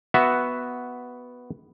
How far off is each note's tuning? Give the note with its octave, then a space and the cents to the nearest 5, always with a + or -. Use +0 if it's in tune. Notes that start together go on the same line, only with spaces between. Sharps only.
B3 +0 F#4 +0 E5 +0